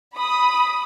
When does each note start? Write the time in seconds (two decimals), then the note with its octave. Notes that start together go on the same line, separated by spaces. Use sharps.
0.15 B5 D#6